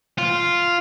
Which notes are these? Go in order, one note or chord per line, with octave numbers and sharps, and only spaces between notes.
F4